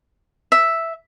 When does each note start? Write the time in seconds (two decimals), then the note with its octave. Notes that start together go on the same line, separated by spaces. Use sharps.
0.52 E5